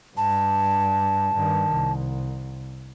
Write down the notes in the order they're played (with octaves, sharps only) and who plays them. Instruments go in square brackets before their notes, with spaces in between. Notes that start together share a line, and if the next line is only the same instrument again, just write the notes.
[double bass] G2 [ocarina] A5
[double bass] G2 D#3
C2